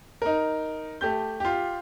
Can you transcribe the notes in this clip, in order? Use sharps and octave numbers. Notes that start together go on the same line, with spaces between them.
D#4 A#4
A3 G4 G6
F4 G4